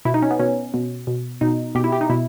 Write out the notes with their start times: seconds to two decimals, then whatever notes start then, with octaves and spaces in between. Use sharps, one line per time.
0.05 B2 E4
0.14 D#4
0.22 C#4
0.31 B3
0.39 B2 C#4
0.74 B2
1.07 B2
1.41 B2 D#4
1.75 B2 G4
1.84 E4
1.92 G4
2.01 D#4
2.10 B2 E4